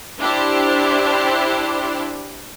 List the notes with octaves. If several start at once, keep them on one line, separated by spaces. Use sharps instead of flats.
D4 E4 G4 C5